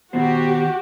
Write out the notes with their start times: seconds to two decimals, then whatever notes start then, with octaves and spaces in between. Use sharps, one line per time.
0.13 D#3 B3 F#4 G4 C5